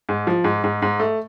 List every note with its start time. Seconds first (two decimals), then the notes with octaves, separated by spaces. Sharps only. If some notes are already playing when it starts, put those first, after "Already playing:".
0.09 G#2
0.27 F3
0.44 G#2
0.64 G#2
0.82 G#2
1.00 A3